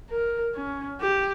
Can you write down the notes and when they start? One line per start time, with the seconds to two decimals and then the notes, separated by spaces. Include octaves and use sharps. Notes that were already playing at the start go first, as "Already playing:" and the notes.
0.10 A#4
0.54 C#4
1.01 G4